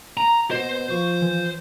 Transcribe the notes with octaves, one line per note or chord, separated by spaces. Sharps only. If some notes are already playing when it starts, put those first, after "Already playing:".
A#5
B2 B3 C5 D#5
F3 F4 C#6
E3